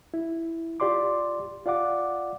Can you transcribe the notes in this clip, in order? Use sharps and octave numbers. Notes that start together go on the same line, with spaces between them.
E4
F4 G4 D5 C6 D6
F4 D5 F5 F#5 D6